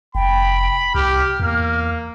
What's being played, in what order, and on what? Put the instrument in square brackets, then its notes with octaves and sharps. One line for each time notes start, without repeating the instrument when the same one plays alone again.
[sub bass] F1 [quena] G5 [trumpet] B5
[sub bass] C2 [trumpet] G4 [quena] F6
[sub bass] E2 [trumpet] A#3